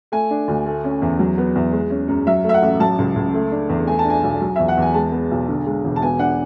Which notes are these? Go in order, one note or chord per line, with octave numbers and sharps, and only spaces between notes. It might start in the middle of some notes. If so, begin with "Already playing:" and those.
A3 G#5
D4
D2
A3
C#4
E2
F#3
B3
E2
G#3
C#4
F#2
F#3 E5
A3
E5
F#5
A1
F#3 A5
C#2
C#2
A3
D4
E2
A3 G#5
A5
D4 G#5
B1
F#3
E2 E5
F#5
E2 G#5
G#3 A5
B3
B1
D3
G#3
E1
A5
B3 G#5
D4 F#5